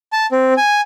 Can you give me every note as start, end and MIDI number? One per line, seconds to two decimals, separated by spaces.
0.12 0.26 81
0.32 0.54 60
0.57 0.81 80